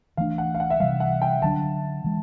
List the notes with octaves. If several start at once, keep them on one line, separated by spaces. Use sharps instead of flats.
E3 A3 D4 F5
F#5
F5
F#5
E5
C3 E3 G3 F5
F#5
G5
D3 F#3 A#3 D4 A5
E3 G#3